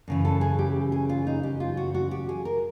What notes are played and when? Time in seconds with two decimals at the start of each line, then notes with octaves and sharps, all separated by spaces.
0.08 F#2 C#3 E3
0.25 A4
0.41 G#4
0.59 G4
0.92 G#4
1.09 F4
1.27 D#4
1.43 G4
1.60 F4
1.77 F#4
1.95 F#4
2.11 G4
2.29 G#4
2.45 A#4